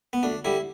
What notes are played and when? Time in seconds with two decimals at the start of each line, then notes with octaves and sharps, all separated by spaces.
0.13 B3
0.23 D2 D4
0.45 D3 G3 E4